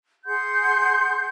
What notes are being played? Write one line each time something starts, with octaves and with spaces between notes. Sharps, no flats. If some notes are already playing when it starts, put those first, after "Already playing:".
G#4 F#5 C6 G6